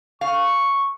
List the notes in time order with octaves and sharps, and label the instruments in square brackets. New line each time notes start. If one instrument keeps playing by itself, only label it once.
[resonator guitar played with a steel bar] F5 [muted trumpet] C#6